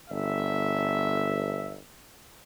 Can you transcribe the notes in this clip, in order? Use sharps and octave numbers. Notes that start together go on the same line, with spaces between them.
G1 E5